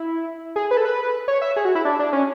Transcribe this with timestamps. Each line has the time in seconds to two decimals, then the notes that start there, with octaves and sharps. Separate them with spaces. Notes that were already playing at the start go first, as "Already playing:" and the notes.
Already playing: E4
0.56 G#4
0.71 B4
0.77 A4
0.85 B4
1.28 C#5
1.42 E5
1.56 G#4
1.65 F#4
1.75 E4
1.85 D4
1.99 D4
2.13 C#4